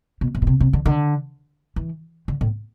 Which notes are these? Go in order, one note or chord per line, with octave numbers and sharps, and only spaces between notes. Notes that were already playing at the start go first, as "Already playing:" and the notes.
B2
A2
B2
C3
C3
D3
D3
E3
D3
A2